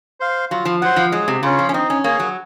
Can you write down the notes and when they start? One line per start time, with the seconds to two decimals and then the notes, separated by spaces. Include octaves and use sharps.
0.20 C5 F5
0.51 F#3 F4
0.65 F3
0.82 F#3 C5 F#5
0.96 F3
1.12 F#3 G#3
1.28 C3
1.43 C#3 C#4 F4
1.59 F3
1.69 C#4
1.73 C4 D#4
1.90 C#4
2.04 A#3 G#4 C#5 G#5
2.20 F#3